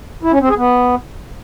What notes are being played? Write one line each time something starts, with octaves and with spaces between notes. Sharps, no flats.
E4
C#4
C4
G#4
B3